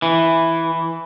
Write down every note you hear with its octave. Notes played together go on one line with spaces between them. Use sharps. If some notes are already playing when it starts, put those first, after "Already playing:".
E3